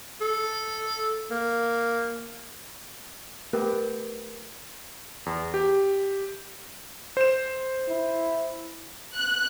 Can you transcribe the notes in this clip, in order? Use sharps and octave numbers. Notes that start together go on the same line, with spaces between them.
A4
A#3
A3 B3 G4 A#4 E6
E2
G4
C5 E7
E4
F#6